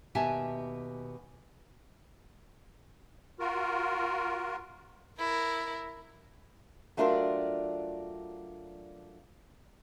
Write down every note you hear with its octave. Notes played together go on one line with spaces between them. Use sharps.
D#2 B2 G4 E5 G#5 A5
F4 F#4 A#4
E4 A#4
F#3 A3 D4 F4 A#4 D5